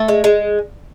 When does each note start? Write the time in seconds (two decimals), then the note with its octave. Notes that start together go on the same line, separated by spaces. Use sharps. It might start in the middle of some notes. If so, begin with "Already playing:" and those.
Already playing: A3
0.08 G#3
0.24 G#3